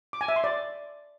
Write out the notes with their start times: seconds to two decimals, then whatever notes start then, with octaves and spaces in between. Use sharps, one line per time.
0.13 D6
0.21 G#5
0.28 E5
0.36 C6
0.44 D5